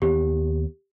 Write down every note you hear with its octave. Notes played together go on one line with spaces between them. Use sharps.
D#2 B3 G4